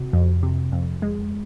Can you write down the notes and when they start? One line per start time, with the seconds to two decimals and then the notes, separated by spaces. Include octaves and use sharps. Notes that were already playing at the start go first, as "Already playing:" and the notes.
Already playing: C3 F#4
0.13 F2
0.43 C3
0.72 F2
1.02 G#3